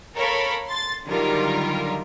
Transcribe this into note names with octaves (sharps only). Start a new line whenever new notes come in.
A4 A#4 C#5 F5 B5
C6 A6
D3 D#3 F#3 G3 F4 A#4